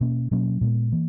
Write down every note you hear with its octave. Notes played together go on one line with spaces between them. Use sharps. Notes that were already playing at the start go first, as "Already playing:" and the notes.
B2 A#3 C#4
B2 F#3 A#3 C#4
A#2 G#3 B3
E3 A#3